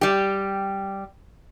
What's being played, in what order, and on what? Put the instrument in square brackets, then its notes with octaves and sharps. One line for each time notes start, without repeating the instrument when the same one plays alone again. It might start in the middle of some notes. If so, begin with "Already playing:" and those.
[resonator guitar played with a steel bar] G3 G4